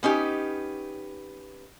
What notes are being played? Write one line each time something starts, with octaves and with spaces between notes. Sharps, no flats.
B3 C#4 D#4 G4